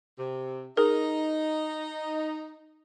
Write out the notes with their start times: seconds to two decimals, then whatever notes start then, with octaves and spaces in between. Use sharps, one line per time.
0.18 C3
0.77 D#4 G#4 A#4